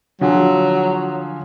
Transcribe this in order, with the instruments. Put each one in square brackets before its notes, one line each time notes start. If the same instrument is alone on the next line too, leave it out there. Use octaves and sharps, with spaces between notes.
[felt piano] D3 F3 G#4 [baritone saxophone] F#3